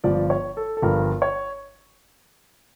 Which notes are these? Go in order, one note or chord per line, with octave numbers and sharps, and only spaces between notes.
G1 G2 F3 D5
C#5
A4
A4
G1 G2 F3 A#4
C#5